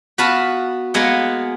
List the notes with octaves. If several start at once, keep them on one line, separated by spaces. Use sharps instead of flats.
B3 F#4 B4 F5 A5 B5
G#3 A#3 B3 G#4 F#5